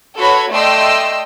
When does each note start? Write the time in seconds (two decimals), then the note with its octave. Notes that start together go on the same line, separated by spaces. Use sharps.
0.19 F#4 A4 B4 C#5 B5
0.52 A3 D5 D#5 G5 C6 E6